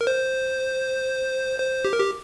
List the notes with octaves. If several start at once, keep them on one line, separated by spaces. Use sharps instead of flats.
A#4
C5
C5
G4
A#4
G4